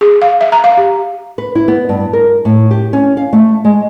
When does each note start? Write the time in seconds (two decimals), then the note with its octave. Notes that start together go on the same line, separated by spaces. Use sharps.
0.01 G#4
0.22 F5
0.41 E5
0.52 A#5
0.64 F5
0.77 G4
1.38 B4
1.55 E4
1.68 B3
1.89 G2
2.13 A#4
2.45 A2
2.71 G4
2.93 C#4
3.17 F5
3.33 A3
3.65 G#3